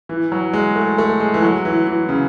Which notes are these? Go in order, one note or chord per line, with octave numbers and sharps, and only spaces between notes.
E3
F#3
G#3
A3
A3
G#3
E3
F#3
E3
E3
C#3